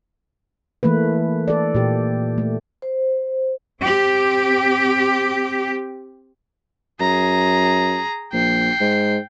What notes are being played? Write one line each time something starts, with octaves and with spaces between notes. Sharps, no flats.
E3 A3 A#3 B4
A4 D5
A#2 G4
A3
C5
C4 G4
F#2 G#4 A#5
A#1 G5 C7
G#2